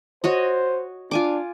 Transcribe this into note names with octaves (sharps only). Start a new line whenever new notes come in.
F#4 C5 C#5 D#5
D4 F4 G#5 D6